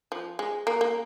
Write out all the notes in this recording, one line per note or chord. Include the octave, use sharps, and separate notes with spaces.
F3
G#3
A#3
A#3